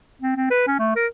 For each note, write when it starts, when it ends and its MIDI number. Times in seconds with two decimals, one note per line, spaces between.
0.22 0.36 60
0.36 0.49 60
0.51 0.65 71
0.67 0.75 61
0.79 0.91 57
0.96 1.07 70